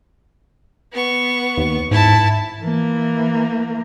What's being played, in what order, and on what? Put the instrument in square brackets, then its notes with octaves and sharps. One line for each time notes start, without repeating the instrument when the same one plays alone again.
[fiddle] B3 C#6
[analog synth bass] D#2
[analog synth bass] G#2 [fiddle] E4 A5
[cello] E3 A#3